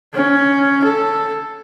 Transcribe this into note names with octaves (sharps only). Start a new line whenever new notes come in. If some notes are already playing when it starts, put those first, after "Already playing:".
C#4
A4